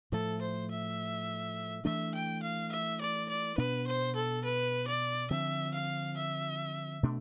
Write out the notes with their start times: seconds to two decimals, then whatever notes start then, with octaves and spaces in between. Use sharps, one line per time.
0.12 A2 F3 A3 A4
0.41 C5
0.71 E5
1.85 E3 A3 D4 E5
2.14 G5
2.43 F5
2.71 E5
3.01 D5
3.29 D5
3.57 B2 B3 D4 B4
3.87 C5
4.15 A4
4.44 B4
4.87 D5
5.31 D3 F3 C4 E5
5.74 F5
6.17 E5
7.03 B2 A3 D4